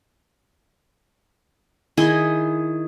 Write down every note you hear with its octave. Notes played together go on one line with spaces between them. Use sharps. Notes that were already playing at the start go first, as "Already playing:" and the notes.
D#3 E4 G#4 D#5